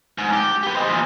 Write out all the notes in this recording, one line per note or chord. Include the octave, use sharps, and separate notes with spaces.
G#2
G4
G4 B4
C5 D#5
A#2 E3